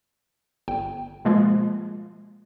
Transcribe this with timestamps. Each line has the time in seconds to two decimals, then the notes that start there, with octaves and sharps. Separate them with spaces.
0.68 G1 G5
1.25 B2 F3 G#3 A#3 F4